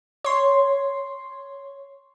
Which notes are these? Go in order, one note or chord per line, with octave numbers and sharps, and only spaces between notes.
C#5 C6